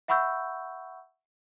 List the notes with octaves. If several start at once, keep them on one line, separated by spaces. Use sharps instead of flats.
E5 F#5 B5 C#6 E6 G6